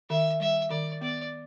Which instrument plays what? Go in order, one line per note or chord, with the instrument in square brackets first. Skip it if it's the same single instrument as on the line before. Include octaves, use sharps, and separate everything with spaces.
[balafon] D#3 [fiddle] E5
[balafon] G3 [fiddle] E5
[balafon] D#3 [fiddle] D5
[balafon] B3 [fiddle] D5